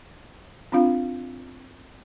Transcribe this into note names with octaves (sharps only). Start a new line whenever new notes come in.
C4 D4 F4 F5